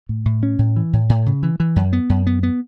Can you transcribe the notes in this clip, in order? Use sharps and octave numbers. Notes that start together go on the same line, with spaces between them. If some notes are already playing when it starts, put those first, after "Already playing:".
A2
A2
C#4
A2
E3
A2
A2
C#3
E3
E3
F#2
B3
F#2
B3
B3